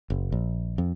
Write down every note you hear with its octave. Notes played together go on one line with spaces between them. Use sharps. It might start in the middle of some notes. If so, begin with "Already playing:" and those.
F#1
A#1
F2